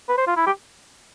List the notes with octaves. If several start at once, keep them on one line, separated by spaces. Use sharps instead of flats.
B4
C5
F4
E4
G4